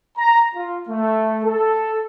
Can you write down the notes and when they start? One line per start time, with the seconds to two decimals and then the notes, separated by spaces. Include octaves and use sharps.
0.18 A#5
0.55 F4
0.89 A3
1.44 A4